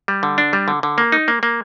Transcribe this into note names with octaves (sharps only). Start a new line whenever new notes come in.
G3
D3
D4
G3
D3
D3
A#3
D#4
A#3
A#3